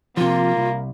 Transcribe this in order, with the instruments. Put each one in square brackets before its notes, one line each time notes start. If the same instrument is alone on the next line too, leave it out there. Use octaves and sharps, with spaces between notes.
[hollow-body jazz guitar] C3 F3 [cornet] A#3 [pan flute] F4
[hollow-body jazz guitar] C2